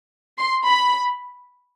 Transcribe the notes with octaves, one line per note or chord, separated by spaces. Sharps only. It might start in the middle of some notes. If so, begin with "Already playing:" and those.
C6
B5